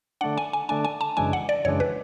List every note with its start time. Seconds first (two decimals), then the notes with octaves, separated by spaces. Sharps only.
0.21 D3 A3 D4 F#5
0.38 G#5
0.53 G#5
0.69 D3 A3 D4 G#5
0.85 G#5
1.01 A5
1.17 F#2 C#3 E3 G#3 D4 G#5
1.33 F#5
1.49 D5
1.65 F#2 C#3 E3 G#3 D4 C#5
1.80 B4